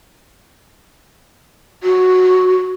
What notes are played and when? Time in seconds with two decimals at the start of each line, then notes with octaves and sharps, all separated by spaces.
1.83 F#4